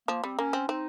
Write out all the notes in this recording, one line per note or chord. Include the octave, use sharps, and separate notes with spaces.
F3 A#3
G3 C4
A#3 C#4
C4
C4 D#4